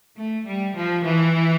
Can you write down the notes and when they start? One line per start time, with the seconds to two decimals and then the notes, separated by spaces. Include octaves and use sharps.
0.16 A3
0.44 G3
0.74 F3
1.03 E3